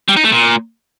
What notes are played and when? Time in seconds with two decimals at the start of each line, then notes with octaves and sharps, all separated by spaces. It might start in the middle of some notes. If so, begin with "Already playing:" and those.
0.09 G3
0.16 D#4
0.24 A3
0.32 A#2